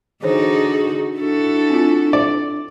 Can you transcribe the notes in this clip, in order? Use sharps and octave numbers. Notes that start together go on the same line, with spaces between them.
D3 E3 D#4 F#4 G#4 C5 C#5
D4 E4 F#4 A4
C4 F4
D5